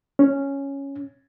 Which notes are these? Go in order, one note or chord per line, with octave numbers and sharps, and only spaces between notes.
C#4